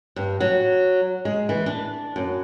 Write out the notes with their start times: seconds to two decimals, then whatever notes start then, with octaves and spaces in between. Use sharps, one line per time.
0.16 G2
0.40 F#3
1.25 G#3
1.49 E3
1.66 D4
2.16 F#2